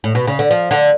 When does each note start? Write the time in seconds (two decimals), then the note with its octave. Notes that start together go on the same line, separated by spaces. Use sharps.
0.04 A2
0.15 B2
0.27 C#3
0.39 D3
0.51 F3
0.71 D3